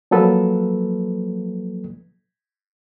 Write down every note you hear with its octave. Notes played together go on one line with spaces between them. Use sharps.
F3 F#3 A#3 A4 B4